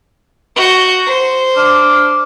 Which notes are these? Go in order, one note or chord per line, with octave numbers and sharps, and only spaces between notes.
F#4 G6
C5
D4 D6 F6